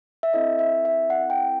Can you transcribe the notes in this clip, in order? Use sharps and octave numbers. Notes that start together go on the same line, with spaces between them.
E5
C4 E4 A4 D#5
E5
E5
F#5
G5